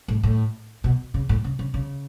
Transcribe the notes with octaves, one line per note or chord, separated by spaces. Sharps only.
A2
A2
B2
C#3
A2
C#3
C#3
C#3